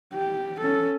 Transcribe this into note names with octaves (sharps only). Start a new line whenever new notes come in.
G4
C#4 A4